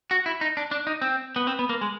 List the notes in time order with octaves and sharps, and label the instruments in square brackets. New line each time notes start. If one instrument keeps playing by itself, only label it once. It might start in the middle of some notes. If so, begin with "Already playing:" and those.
[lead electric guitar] F#4
E4
D#4
D4
D4
D#4
C4
B3
C4
B3
A#3
G#3